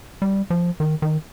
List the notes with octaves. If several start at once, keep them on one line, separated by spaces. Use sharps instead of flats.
G3
F3
D#3
D#3